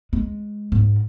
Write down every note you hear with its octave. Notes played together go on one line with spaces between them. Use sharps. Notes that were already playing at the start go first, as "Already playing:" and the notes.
G#3
G#2